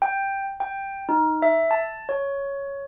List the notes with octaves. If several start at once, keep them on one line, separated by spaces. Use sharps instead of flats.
G5
G5
D#4
E5
A5
C#5